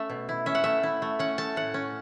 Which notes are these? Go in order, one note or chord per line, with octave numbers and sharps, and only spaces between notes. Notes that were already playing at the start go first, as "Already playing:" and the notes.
Already playing: A3 C#4 E5
B2
E4
C#4 E5
F#5
A3 E5
E4
A3
C#4 F#5
A3 A5
A2 F#5
C#4